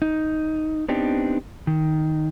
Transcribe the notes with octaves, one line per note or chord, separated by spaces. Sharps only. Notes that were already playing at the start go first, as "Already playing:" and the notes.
D#4
B3 C4 D4 D#4 G4
D#3